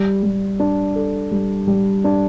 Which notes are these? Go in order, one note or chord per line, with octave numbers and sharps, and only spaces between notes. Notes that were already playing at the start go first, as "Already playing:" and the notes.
Already playing: G3
G3
D4
A4
G3
G3
D4